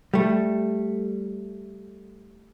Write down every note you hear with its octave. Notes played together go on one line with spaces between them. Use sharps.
G3 A3